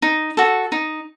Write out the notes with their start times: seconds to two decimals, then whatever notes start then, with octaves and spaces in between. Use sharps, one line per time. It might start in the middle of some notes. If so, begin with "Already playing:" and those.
0.02 D#4
0.37 F#4 A4
0.72 D#4